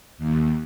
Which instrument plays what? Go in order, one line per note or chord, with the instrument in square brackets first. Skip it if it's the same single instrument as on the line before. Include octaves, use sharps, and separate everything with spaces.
[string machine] D#2